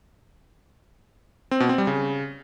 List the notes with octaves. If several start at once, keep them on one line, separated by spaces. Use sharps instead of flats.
C4
B2
C4
G3
C#3